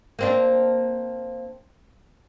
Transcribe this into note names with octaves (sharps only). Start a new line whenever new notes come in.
A#3 C4 D4